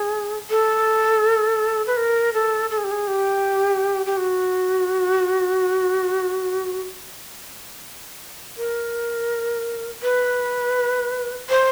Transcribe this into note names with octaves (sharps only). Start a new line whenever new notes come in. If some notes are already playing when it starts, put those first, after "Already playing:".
Already playing: G#4
A4
B4
A#4
A4
A4
G#4
G4
G#4
G4
G4
F#4
A#4
B4
C5